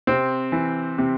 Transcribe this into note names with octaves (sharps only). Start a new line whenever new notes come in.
C3 C4
E3
C3